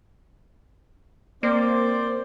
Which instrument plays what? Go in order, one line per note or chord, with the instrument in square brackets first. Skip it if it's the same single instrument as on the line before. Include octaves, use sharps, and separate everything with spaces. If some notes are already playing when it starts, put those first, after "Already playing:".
[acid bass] A#3 [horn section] C4 C5 D5